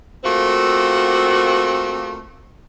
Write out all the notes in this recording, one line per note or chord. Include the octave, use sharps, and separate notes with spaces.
A3 A#3 C4 F4 F#4